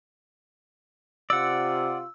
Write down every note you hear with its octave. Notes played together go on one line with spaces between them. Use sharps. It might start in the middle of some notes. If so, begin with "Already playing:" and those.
C3 F4 D5 F#5 E6